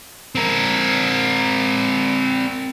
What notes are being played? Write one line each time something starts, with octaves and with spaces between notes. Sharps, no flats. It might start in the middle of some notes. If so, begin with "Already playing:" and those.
C4 A#4